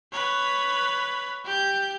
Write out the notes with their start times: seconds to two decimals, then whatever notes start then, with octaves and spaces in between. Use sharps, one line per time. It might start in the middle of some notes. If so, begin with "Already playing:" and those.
0.12 B4 C#5
1.45 G4 G6